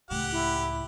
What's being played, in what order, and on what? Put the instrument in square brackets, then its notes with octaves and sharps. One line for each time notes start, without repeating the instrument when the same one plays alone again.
[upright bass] C#2 A2 [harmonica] G4 F#5
[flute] E4